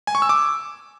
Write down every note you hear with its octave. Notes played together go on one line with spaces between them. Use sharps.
G#5
C#6
E6
D6